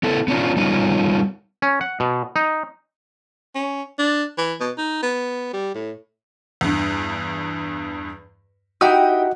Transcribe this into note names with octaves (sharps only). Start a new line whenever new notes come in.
B3 E4 A4
B3 C#4 D4 F4
G3 B3 C#4 D#4 F4
C#4
F#5
B2
D#4
C#4
D4
E3
B2
D#4
B3
G3
A2
E2 G2
D#4 E4 F#4 G4 D#5 F#5 G5 D#6